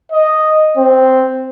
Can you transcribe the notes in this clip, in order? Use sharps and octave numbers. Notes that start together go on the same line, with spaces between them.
D#5
C4